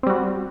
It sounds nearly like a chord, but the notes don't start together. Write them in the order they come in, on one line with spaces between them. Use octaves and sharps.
C4 G3 F#4